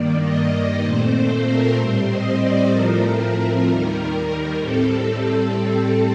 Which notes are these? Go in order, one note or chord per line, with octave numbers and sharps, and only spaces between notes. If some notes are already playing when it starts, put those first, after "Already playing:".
Already playing: G2 D#3 A#3 D5
D#5
D5
A#2 A3 C4 C5
A4
A#4
A2 G3 C4 C5
D#5
D5
A2 F3 A3 C4 A#4
D#2 D#3 G3
A2 G3 C4 A4